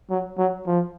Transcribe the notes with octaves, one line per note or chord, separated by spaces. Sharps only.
F#3
F#3
F3